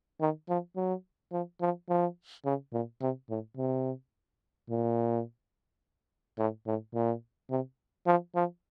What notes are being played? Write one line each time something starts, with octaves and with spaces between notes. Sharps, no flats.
D#3
F3
F#3
F3
F3
F3
C#3
A#2
C3
A2
C3
A#2
A2
A2
A#2
C3
F3
F3